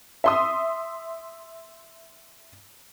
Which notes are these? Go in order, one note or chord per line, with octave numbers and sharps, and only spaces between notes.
E5 C6 D#6